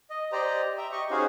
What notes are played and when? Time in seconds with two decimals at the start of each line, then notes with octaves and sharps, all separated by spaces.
0.10 D#5
0.32 G4 C5 D5 D#5 A#5
0.78 E5 G5 A#5
0.92 G4 D#5 C#6
1.11 C#4 D#4 F#4 G#4 C5 F5